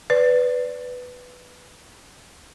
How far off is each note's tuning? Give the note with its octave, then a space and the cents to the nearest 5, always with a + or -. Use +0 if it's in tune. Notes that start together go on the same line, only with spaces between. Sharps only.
B4 +5 D5 -10